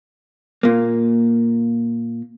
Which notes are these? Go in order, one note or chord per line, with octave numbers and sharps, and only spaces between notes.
A#2 A#3